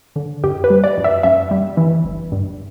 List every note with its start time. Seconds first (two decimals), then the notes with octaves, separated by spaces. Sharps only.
0.16 D3
0.43 F#2 G4
0.64 B4
0.70 G3
0.84 D5
0.98 F#2
1.04 E5
1.23 F#2 E5
1.51 G3
1.77 E3
2.04 G1
2.32 G2